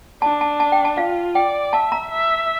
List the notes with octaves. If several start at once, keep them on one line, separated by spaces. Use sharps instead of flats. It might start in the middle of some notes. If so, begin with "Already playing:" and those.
D4 A5
A5
A5
G5
A5
F4 F5
D5 G5
E5 A5
A#5
E5